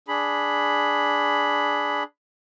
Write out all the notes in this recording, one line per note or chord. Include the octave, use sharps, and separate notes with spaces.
D4 G#4 B5